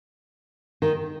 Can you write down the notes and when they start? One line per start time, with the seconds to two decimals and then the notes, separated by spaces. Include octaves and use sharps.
0.82 D#3